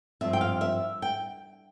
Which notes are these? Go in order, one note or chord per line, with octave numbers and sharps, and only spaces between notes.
G2 F3 C4 E5
G5
F5
E5
G5